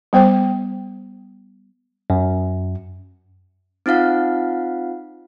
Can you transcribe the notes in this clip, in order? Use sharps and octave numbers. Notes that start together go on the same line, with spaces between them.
G3 B3 C5 G5
F#2
C4 D#4 F4 F5 F#5